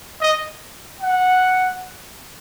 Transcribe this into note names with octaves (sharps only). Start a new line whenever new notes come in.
D#5
F#5